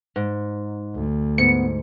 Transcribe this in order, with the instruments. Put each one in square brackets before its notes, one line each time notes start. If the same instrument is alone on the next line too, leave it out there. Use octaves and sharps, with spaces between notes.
[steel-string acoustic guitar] G#2
[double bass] D2
[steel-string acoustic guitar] G#2 [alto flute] B3 [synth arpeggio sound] C#7